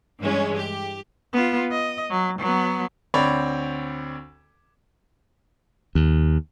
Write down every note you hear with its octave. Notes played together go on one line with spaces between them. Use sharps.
G2 E3 G#3 C#4
G4
B3 F4
D#5
F#3
F#3 B3
D2 C4 C#5 D5 B5
D#2